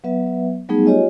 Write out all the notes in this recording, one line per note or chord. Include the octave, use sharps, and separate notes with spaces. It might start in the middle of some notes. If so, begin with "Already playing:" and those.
F#3 B3 B4 E5
F#3 G3 A3 B3 D#4 G#4
F4 G4 C#5 D#5 G#5